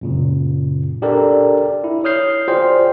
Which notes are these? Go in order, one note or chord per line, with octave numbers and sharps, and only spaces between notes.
F#2 A#2 C#3
D4 G4 A4 A#4 D5
E4
C#5 D#6 F6 G6 C7
F4 F#4 G#4 C5 D5 G5